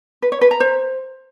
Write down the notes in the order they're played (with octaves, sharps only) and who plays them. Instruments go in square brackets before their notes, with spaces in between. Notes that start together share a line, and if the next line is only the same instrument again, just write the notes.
[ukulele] B4
C#5
B4
A#5
C5